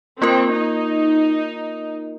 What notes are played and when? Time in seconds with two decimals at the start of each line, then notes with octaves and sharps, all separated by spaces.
0.22 A#3 C4 F4 A#4
0.53 D#4